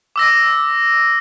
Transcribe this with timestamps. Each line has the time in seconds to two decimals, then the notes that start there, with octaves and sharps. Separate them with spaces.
0.16 D6 E6 A#6